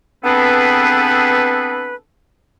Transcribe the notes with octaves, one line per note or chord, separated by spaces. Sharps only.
B3 C4 D4 G#4 A4 B4